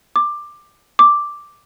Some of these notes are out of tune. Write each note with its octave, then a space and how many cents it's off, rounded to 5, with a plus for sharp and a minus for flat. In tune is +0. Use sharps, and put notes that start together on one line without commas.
D6 +15
D6 +0